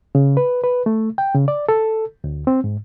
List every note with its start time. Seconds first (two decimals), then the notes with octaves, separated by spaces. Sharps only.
0.15 C#3
0.37 B4
0.64 B4
0.86 A3
1.18 G5
1.35 C#3
1.48 D5
1.69 A4
2.24 D2
2.47 C4
2.64 G#2